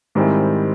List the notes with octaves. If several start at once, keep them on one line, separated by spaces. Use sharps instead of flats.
G#2 D#3 G3 C4 E4